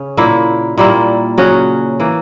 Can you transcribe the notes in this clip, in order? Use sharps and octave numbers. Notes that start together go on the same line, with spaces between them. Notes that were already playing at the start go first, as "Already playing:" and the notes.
Already playing: C#3 C#4
A#2 A#3 E4
A#2 G3 A#3 E4
C#3 F#3 C#4 F#4
E3 A#3